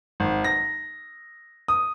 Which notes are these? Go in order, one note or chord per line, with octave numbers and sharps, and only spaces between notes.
G#1
A#6
D#6